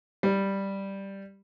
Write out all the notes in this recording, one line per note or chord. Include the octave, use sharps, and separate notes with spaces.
G3